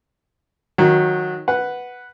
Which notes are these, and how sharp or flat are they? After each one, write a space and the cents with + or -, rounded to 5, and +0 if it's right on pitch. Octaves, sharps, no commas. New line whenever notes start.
D#3 +0 F#3 -20
B4 +0 F#5 +0